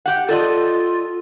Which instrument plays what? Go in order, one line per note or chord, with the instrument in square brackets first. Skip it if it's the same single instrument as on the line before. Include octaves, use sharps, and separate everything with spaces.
[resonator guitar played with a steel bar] G4 F#5
[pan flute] F4 [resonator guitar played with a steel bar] A4 D5 D#5